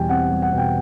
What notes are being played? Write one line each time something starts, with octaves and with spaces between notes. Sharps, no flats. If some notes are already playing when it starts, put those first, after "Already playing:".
Already playing: E2 B2 G3 G5 G#5
C4 F#5
G3
F#5
B2 G5